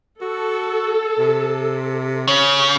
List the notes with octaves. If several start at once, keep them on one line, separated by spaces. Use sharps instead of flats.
F#4 A4
C3
C#3 C#4